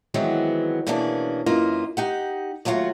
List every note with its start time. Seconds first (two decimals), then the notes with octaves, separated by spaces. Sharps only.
0.14 D#3 E3 F#3 G#3 B3 C4
0.87 B2 E3 A#3 C#4 D4 G#4
1.46 F#2 E3 A#3 D#4 F4
1.97 D#4 G4 F#5
2.65 D#2 F#3 A3 F4 F#4